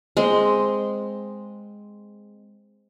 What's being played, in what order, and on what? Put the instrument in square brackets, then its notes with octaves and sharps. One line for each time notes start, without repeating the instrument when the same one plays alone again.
[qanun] G#3 C4